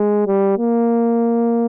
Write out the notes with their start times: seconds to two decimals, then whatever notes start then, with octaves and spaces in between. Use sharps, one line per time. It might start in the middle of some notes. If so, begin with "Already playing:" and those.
Already playing: G#3
0.27 G3
0.58 A#3